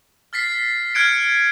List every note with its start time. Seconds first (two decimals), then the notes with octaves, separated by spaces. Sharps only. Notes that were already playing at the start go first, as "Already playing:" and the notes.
0.33 F6 A6 B6 C7
0.95 F6 F#6 G#6 C#7 D7